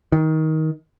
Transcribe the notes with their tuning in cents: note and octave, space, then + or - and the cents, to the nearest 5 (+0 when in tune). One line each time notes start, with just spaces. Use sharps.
D#3 +20